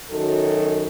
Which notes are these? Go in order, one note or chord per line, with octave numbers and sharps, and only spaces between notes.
F#2 D#3 F#3 A4